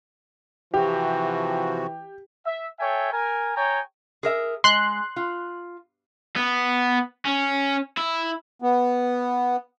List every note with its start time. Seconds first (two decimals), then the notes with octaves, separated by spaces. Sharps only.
0.74 C3 E3 F3 F#4 G4
2.45 E5
2.79 A4 C#5 E5 G5 G#5
3.13 A#4 G#5
3.56 G#4 C#5 G5 G#5 A#5
4.23 G#4 A#4 E5
4.64 G#3 C6 F#6
5.16 F4
6.36 B3
7.25 C#4
7.97 E4
8.62 B3